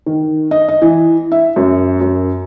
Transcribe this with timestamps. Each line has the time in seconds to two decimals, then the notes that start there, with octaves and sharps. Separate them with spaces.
0.06 D#3
0.51 D#5
0.68 D#5
0.82 E3
1.32 E5
1.56 F#2
2.01 F#2